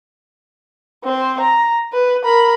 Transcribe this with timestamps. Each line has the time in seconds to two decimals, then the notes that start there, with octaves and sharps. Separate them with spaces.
1.04 C4 C5
1.40 A#5
1.93 B4
2.24 A#4 B5